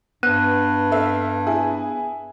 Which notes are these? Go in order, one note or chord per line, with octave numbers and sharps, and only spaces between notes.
G2 B3 F#6 D#7
A4 E5 F5
E4 G#4